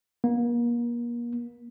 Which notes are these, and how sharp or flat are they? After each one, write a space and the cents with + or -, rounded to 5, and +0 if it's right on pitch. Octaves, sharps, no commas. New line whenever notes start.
A#3 +35